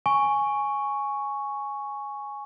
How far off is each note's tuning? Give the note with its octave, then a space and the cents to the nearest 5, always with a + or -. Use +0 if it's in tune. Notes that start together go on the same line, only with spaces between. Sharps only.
G#5 +0 C#6 +0